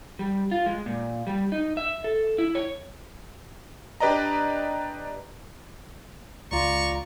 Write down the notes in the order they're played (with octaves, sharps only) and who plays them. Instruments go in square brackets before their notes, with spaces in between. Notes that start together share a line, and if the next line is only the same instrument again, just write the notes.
[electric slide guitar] G3
F4
G#3
A#2
G3
D#4
E5
A4
E4
C#5
[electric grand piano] D4 G4 B4 D5 D#5 A#5
[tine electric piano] C#2 F4 [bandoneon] D5 A#5 [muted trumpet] C#6